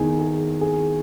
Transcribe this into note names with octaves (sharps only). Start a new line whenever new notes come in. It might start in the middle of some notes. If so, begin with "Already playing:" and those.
Already playing: E2 D#3 G#4
G#4
G#4